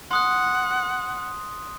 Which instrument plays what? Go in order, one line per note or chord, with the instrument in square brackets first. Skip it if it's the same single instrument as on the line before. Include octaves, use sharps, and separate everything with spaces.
[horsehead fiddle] F#5 [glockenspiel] C6 D#6 F#6